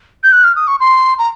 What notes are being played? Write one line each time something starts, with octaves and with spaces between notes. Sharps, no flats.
G6
F#6
F6
D#6
C#6
C6
A#5